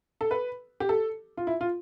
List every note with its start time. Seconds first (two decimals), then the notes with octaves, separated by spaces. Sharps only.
0.21 A4
0.31 B4
0.80 G4
0.89 A4
1.37 F4
1.47 E4
1.61 F4